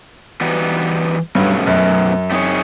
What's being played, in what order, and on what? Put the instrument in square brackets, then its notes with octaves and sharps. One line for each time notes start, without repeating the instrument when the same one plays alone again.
[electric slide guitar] E3 G3 B3 D#4 F#4
[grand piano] G2 [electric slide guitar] B2 F#3 A3 C#4
[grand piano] F#2
[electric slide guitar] A3 C4 D#4 G#4 C#5